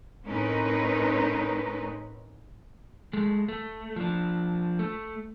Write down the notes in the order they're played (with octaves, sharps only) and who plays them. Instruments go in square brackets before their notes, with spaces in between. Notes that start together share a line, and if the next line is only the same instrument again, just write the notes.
[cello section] A2 C4 C#4 D#4 A#4 B4
[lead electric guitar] G#3 A3
A3
F3 D4
A3